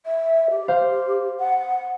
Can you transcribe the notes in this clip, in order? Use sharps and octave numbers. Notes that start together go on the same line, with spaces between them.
E5
G4
C5 F5 C6
F#5